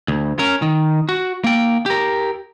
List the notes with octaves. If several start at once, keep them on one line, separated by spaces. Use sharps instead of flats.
D2
C#4 A#4
D#3
F#4
A#3 G5
G4 A#4